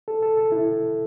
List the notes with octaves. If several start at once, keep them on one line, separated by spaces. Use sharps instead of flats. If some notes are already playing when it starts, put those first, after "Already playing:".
A4
A4
A4
E4